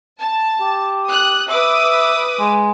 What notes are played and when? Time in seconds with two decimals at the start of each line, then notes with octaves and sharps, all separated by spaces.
0.20 A5
0.61 G4
1.09 D#6 F#6
1.49 B4 E5 D6 D#6
2.39 G#3